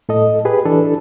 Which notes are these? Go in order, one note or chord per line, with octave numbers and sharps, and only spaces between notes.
A2 A4 D#5
G4 G#4 B4
E3 D4 A4 B4